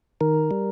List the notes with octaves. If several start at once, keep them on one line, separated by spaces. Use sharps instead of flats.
D#3 A#4
G3